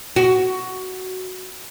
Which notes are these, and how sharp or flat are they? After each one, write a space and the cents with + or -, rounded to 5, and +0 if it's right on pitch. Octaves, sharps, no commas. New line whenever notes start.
F#4 +10